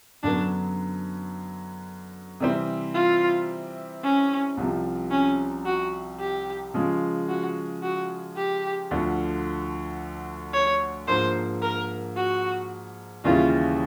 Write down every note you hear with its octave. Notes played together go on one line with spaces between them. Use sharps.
F#2 D3 F#3 B3 D4
C3 E3 G3 C4
F4
C#4
C2 C3 F3
C#4
F#4
G4
C#3 F3 G#3
F#4
F#4
G4
D2 D3 F3
C#5
G#2 F3 A#3 D4 C5
A#4
F#4
D#2 C#3 E3 G3 F4